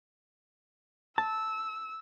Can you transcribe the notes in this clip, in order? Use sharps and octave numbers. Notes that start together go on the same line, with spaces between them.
A5 E6